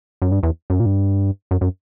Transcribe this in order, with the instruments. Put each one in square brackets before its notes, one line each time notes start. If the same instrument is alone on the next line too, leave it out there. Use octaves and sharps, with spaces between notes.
[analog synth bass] F#2
G2
E2
F#2
A#2
G2
F#2
F#2